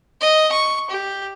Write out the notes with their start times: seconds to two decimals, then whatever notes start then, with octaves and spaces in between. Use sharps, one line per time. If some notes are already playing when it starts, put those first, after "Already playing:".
0.21 D#5
0.52 C#6
0.90 G4